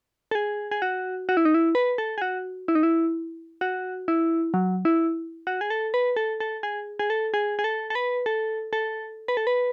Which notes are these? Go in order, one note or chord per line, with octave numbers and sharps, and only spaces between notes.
A4
G#4
G#4
F#4
F#4
E4
D#4
E4
B4
A4
G#4
F#4
E4
D#4
E4
F#4
E4
F#3
E4
F#4
G#4
A4
B4
A4
A4
G#4
G#4
A4
G#4
G#4
A4
A4
B4
A4
A4
B4
A4
B4